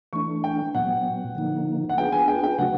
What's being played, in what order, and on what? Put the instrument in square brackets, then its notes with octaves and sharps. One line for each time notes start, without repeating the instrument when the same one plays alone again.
[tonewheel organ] E3 A3 D4 [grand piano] C#6
[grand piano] G5
[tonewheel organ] A#2 F#3 B3 [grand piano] F#5
[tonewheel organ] D3 F3 A#3 D#4
[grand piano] F#5
[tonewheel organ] B3 D4 F4 G#4 B4 [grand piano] G5
[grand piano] G#5
G5
G5
[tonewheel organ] C#3 F#3 A3 D4 F#4 [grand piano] F#5